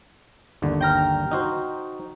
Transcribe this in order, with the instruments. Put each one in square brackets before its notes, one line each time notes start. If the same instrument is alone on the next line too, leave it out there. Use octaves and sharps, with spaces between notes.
[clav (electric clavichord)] G1 D#2 D3
[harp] G5 A#5 F6
[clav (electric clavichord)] D#4 F#4 C5